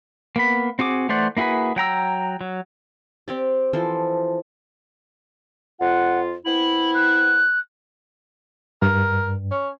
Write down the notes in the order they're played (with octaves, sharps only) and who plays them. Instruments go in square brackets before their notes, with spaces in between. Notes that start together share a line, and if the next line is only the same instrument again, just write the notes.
[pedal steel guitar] A#3 B3 B5
C4 F#4 G#4 D6
E3 A3 C5 D5 F#5
A#3 E4 F#4 G#4 B4
F#3 G5 A#5 E6
F#3
[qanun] C4 G4 D5
E3 F3 A4 C5
[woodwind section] F2 F4 [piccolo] F#5
[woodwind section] B3 C4 E4 [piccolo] F#7
[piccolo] F#6
[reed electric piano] G2 [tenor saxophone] A#4
[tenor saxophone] C#4